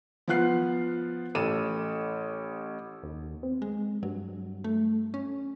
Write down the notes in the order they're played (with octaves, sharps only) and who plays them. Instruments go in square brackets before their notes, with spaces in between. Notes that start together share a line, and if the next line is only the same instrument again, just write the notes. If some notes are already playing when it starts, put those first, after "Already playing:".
[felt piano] F3 B3 F4 F#5 F#6 C7
A1 A4 D#7 E7
[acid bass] D#2
C4
[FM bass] G#3
[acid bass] G2 [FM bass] F#3
[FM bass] A3
C#4